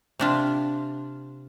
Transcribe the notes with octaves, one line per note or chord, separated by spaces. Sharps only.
C3 D4 F4